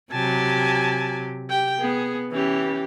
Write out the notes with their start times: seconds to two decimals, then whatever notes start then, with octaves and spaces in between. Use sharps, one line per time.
0.12 C3 F#3 G4 G#5 A5
1.50 G4 G5
1.80 B3 G#4
2.32 E3 C#4 G4